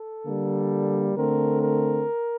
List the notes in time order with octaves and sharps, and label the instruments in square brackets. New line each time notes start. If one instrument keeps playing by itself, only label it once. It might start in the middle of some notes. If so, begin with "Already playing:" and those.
Already playing: [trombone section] A4
D3 G3 A#3
D3 A3 C4 A#4
A#4